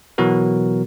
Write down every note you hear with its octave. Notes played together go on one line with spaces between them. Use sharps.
B2 E3 F#3 B3 F#4 A#4